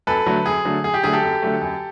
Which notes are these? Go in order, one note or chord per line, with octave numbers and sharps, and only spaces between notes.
F#2 A4 B4
D3 F#3 A3
F#2 G#4
D3 F#3 A3
F#2 G#4
G4
D3 F#3 A3 G#4
G4 A4
F#2
D3 F#3 A3
F#2